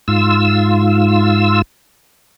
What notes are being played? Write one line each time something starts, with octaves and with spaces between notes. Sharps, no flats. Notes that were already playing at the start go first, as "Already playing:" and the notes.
G#2 F4 E6